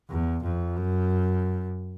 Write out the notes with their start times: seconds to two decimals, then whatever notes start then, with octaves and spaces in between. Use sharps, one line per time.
0.09 E2
0.44 F2
0.76 F#2